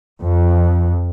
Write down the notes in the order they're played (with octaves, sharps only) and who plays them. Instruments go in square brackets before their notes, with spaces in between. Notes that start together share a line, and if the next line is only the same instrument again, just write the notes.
[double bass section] F2